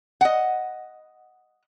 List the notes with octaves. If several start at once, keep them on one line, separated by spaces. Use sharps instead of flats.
D#5 F#5